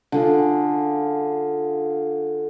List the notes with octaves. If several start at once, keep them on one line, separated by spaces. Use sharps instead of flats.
D3 F4 G#4